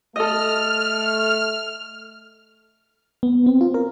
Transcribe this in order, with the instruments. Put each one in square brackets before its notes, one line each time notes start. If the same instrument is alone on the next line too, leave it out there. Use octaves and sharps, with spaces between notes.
[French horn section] A3 [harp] A4 D#5 [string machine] F6
[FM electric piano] B3
C4
F4
A#4